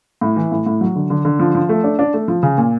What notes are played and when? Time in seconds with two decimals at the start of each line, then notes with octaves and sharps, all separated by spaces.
0.21 A2
0.36 E3
0.52 A2
0.66 A2
0.81 F#3
0.96 D3
1.10 D3
1.25 D3
1.39 F3
1.55 F3
1.69 A3
1.84 D4
1.99 D4
2.14 A3
2.28 F3
2.43 C#3
2.58 A#2